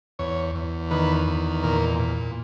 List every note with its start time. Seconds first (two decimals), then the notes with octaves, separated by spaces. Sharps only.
0.19 E2 C#5
0.55 E2
0.91 D#3 B4
1.27 E2
1.63 A#2 A#4
1.99 A#2